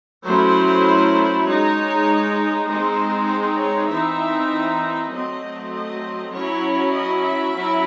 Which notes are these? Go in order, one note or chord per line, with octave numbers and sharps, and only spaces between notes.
F#3 A3 C#4 E4 C5
G#3 D#4 C#5
G#3 C4 D#4 C5
C5
C#5
E3 C4 D#4 E5
F#3 A3 C4 D#5
D#5
F#3 C#4 E4 C#5
D#5
E5
F#3 C#4 E4